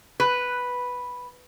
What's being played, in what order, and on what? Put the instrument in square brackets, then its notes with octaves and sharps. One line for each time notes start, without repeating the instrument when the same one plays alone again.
[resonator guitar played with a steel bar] B4